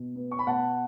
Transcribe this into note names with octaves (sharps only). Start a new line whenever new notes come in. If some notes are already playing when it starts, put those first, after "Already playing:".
Already playing: B2
B3
C#6
B5
B2 F#5 A5